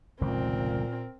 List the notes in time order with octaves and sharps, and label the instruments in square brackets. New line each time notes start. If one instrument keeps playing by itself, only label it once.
[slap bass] F1 C#2 D#3 [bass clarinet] A#2 [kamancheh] C4 A#4